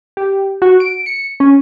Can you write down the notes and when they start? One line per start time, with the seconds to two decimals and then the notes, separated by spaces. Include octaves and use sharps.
0.17 G4
0.62 F#4
0.80 D7
1.06 C#7
1.40 C#4